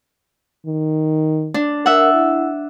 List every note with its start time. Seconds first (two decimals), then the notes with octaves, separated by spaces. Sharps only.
0.67 D#3
1.54 D4
1.86 A#4 E5 F#5
2.14 E4